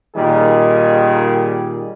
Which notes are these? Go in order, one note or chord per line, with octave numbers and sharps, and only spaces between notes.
A#2 D#3 G3 G#4